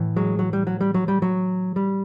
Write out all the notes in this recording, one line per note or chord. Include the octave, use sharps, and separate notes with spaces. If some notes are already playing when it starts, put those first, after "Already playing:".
Already playing: A2 E3
F#3 G#3
F#3
G3
F#3
G3
F#3
G3
F#3
G3